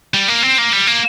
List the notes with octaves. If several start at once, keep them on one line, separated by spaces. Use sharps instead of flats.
G3
A#3
C4
A#3
G3
A#3